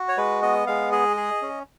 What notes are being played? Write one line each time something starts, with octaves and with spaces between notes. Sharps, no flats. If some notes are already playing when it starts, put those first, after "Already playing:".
Already playing: F#4
C#5
G#3 B4
B3 D#5
G#3 F5
G#4 D#5
G#4
C#4